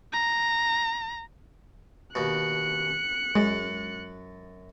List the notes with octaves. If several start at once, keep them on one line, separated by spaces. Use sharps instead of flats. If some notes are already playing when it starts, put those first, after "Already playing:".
A#5
D#2 B2 F#6 C#7
F#2 G#3